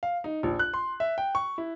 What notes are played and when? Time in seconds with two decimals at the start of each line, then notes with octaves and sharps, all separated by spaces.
0.03 F5
0.24 D#4
0.43 A#1
0.59 F#6
0.74 C6
1.00 E5
1.18 G5
1.35 C#6
1.58 E4